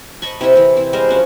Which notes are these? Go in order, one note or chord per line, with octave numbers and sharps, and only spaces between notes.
D#5 A5 B5 C#6
C3 E4 D#5 E5
C3 E3
C4 E4
G3 G#3 A#4 C5
F3 C#4 F#4